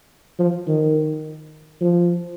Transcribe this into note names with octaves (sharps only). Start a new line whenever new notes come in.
F3
D#3
F3